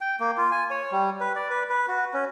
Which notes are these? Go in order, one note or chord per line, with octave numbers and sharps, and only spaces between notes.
G5
A#3
F4
G#5
C#5
G3
B4
D5
B4
B4
F#4
C#4